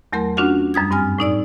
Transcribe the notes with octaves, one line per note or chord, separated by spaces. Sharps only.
E2 F#3 A3 A#4 C6
C#4 D4 F4 F#4 F#5
F#2 G3 D#6 G#6
G2 C4 G#5 F6
A2 D#4 D5 E6